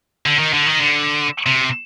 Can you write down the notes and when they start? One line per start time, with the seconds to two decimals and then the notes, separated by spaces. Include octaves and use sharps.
0.26 D3
0.39 D#3
0.53 D3
0.66 D#3
0.80 D3
1.46 C3